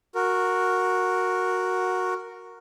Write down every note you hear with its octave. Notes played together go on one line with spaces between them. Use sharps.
F#4 A#4